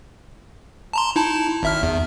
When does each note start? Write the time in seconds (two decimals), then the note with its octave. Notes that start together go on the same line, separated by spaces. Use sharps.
0.93 A5 A#5 C6
1.16 D#4 E4 A5
1.63 G#1 E5 F6
1.83 E2